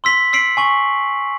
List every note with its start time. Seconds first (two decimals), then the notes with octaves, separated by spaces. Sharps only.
0.04 C6 E6 B6 F#7
0.33 E6 B6 C7 D7 F#7
0.57 G#5 C#6 F#7